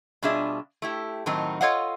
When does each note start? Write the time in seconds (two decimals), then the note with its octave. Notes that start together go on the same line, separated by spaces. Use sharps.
0.22 B2 G3 D4 F4 G#4 E5
0.82 A3 E4 G4
1.26 A2 D#3 F#3 C4 D#4
1.61 F4 A4 C#5 D#5 F5 F#5